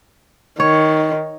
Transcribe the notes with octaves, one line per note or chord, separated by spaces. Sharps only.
D#3 C#5